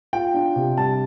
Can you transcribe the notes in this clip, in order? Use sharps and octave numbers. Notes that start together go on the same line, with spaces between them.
F4 G5
D4
C3
G3 A5